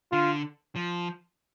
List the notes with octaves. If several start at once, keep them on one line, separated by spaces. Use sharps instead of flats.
D3 F4
F3